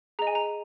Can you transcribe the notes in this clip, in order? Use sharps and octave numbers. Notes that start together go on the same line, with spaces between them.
G#4 D#5 A#5
G#5
A#5